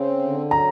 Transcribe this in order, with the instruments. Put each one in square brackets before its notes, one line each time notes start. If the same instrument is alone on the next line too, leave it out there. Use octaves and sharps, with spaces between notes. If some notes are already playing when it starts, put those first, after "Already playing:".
Already playing: [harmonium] C#3 C4
D3
[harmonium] F#3 [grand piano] A#5